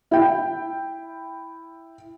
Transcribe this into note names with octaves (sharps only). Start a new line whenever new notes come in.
E4 G5